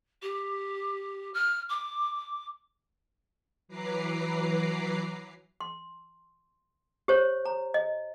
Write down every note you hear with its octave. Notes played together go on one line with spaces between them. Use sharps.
G4
F6
D6
E3 F#3 B4 A#5 D6 C7
C6
G4 C5 C#5
A#5
D#5